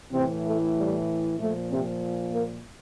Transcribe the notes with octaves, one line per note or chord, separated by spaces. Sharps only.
A2 C3 E3 C4
A3
G3
A#2 F3 A3
C3 C4
A#3 A#4